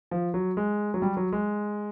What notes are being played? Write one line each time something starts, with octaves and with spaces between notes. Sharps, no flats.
F3
F#3
G#3
F#3
G3
F#3
G#3